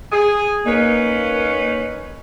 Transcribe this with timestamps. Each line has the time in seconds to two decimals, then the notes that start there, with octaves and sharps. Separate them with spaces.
0.12 G#4
0.67 A#3 C#4 D#4 B4